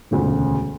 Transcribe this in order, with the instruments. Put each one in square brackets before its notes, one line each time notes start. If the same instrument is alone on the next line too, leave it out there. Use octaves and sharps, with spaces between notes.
[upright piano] E1 D2 C#3